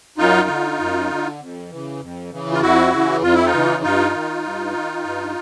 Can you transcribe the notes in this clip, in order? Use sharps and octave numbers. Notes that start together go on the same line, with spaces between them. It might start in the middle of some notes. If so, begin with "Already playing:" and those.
F#2 D#4 F4
D3
F#2
D3
F2
C#3 E3
F2
C#3 E3
F4
F2 E4 F#4
C#3 E3
F2 F4
E4
D#4 F4
C#3 E3
G2 D#4 F4
D#3
G2
D#3
G2